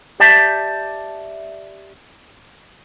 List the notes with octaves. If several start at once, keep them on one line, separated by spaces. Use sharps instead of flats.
G4 D5 E5 A5